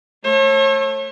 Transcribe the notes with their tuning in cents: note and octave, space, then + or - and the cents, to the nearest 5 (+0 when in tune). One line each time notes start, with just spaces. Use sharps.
A3 +0 C#5 -40